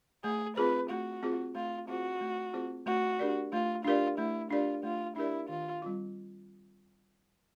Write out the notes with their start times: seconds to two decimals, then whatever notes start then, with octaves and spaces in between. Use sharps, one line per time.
0.24 A3 G#4
0.56 C4 F4 G#4 B4 C5
0.89 A3 F#4
1.23 C4 F4 G#4 C5
1.55 A3 F4
1.88 C4 F4 F#4 G#4 C5
2.21 A3
2.53 C4 F4 G#4 C5
2.86 A3 F#4
3.19 D4 G4 A#4 D5
3.52 A3 F4
3.85 D4 F4 G4 A#4 D5
4.18 A3 E4
4.51 D4 F4 G4 A#4 D5
4.83 A3 F4
5.16 D4 E4 G4 A#4 D5
5.49 D#3 F4
5.82 G3 C4 F4